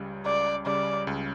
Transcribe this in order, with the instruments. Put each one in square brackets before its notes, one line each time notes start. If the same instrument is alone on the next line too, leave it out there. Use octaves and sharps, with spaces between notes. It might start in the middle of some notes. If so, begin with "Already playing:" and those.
Already playing: [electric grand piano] C#2 C#3 G3
[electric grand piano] C#2 [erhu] D5
[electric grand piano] C#3 G3 [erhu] D5
[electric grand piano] C#2